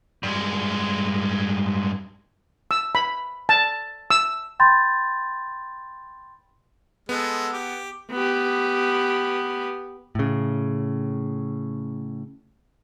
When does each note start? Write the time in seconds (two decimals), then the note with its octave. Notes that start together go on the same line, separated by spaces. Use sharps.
0.23 G2 G#3
2.71 E6
2.95 B5
3.49 A5
4.11 E6
4.60 G5 B5 C6 G6 A6
7.09 G#3 B3 A4
7.53 G4
8.11 B3 G4
10.15 A2 C#3